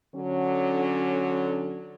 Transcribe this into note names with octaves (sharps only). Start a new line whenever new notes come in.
D3 F#3 C#4